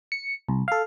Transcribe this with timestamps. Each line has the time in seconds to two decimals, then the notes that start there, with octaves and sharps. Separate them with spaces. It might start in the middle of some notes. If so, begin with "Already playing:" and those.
0.12 C#7
0.48 C2
0.68 A4 F5